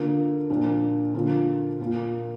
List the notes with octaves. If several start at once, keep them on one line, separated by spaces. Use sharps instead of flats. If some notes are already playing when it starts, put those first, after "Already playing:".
Already playing: D3 A#3 F4
A#2 F3 D4 F4
D3 F3 A#3 F4
A#2 A#3 F4